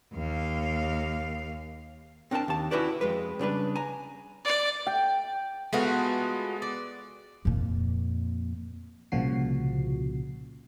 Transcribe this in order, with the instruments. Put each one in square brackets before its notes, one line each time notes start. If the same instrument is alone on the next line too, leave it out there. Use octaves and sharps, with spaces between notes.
[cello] D#2 F5
[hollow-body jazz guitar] C4 D4 A#4 G5 A5
D#2 A5
C#4 E4 F#4 G4 B4 D5
F2 G#3 B4
C#3 G3 D4 B4
G#5 A#5
[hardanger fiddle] D5
[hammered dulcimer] G5
[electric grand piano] G#3 B3 [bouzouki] A3 F4 F#4
[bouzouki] D5
[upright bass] F2 A#2
[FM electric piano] C2 A#2 C#3 F3 F#4 C7